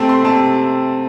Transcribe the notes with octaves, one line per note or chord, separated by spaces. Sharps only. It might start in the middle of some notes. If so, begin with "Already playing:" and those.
Already playing: C3 A3 C4 E5 G5 A5
C6
C3 A5